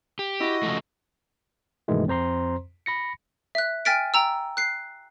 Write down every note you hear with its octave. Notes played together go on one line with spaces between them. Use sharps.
G4
E4 F#4 D#5 D#6
C#3 F3 A3
G2 B2 D#3 E3 G#3 A3
F2 C4 C5 A#5 C6
B5 A#6 C#7
E5 F#6
G5 G#5 F6 A6 B6 D7
G5 A#5 E6
F#6 C7